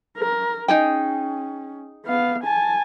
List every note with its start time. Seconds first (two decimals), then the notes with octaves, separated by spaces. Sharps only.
0.18 A#4
0.68 C#4 D#4 G#4 G5
2.05 B3 F5
2.44 G#5 A5